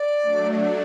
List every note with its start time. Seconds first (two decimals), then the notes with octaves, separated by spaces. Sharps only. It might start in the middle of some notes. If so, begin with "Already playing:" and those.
Already playing: D5
0.22 F#3 A3 D4
0.52 D#5
0.55 D5